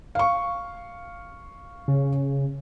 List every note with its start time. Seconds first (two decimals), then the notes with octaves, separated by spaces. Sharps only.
0.15 F5 C#6
1.88 C#3